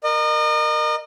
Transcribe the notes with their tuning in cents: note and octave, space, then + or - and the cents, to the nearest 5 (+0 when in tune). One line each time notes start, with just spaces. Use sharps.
A#4 +0 D#5 -35